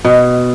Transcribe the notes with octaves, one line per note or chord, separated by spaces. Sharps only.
B2